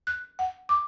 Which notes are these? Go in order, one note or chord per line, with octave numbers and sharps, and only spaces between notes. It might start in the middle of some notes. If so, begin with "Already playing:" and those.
F#6
F#5
D6